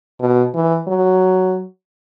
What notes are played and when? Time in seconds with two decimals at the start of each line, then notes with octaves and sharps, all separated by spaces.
0.21 B2
0.54 E3
0.88 F#3